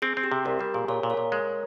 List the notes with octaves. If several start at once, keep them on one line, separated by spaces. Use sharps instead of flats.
C4 G#4
C4
G4
C3
C2 G4 A#4
G3 G4
A#2 G#4
A#2 A#4 C#5
A#2
A#4 C#5
A#2
G#3